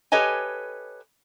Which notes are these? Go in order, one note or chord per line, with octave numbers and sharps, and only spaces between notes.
G4 A4 B4 C#5 D#5 G#5